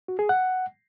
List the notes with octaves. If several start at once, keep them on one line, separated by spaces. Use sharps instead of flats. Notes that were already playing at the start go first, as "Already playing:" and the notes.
F#4
G#4
F#5